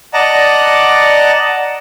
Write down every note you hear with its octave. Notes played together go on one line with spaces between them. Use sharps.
D5 D#5 F#5 A5 A#5